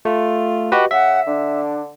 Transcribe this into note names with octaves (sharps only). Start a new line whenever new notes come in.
A3 F4
F#4 G4 B4 D#5
C#3 E5 F#5
D3 D4